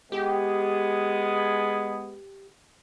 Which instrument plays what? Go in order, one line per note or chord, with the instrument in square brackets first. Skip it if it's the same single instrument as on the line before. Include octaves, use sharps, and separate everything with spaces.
[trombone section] G#3 B3 G#4 [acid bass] G4